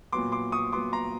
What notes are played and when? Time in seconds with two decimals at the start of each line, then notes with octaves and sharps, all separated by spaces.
0.13 A#2 F#3 B3 C6 D6
0.32 C6 D6
0.52 C#6 D#6
0.72 A#2 F#3 B3 C6 D6
0.93 A#5 C6